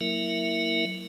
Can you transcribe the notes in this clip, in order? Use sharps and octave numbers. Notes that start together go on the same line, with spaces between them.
F#3 A#3 E4 A#4 E5